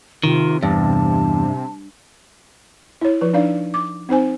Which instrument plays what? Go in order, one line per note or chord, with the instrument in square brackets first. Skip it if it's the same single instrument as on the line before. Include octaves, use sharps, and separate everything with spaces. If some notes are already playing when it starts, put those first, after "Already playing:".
[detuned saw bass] C3 [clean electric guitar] D#3 [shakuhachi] F4
[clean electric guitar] E2 [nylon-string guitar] G2 [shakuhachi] A5
[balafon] E4 C#5
F3 B4
D4 D#4 D5 F5
D6
C4 D#4 C5 G#5